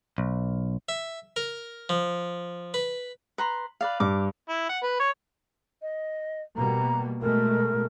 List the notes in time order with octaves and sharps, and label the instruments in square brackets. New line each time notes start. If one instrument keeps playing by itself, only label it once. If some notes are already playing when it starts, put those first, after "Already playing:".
[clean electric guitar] B1
[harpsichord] E5
A#4
F3
B4
[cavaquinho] B4 A#5 C6
B4 D5 F5
[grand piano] G2 [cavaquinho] D6
[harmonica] E4
F#5
B4
C#5
[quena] D#5
[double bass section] B2 G3 A#3 [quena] A#5
[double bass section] B2 G#3 A3 [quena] A#4